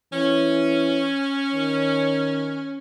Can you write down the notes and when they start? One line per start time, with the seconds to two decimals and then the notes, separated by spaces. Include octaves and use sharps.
0.13 E3 C#4
1.53 D#3